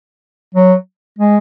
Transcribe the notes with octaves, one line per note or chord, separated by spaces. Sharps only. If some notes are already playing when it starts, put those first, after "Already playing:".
F#3
G#3